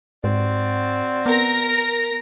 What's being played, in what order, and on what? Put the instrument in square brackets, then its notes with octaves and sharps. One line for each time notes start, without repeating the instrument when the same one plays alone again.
[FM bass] G#2 [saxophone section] C4 F#4 D5
[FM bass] B3 [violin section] A#4 A#6